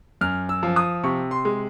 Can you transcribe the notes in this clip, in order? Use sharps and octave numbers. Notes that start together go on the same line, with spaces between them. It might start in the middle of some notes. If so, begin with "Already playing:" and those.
F#2 F6
E6
F3
D#6
C3 C#6
C6
G#3